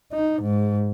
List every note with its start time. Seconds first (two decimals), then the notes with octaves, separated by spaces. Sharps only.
0.13 D#4
0.43 G#2